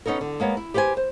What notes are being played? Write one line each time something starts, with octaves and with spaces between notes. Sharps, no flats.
B3 C#4 D#4 A4 A#4
D3
G#3 A#3 B3 C#5
E4
G4 B4 C5 F#5 G#5
C5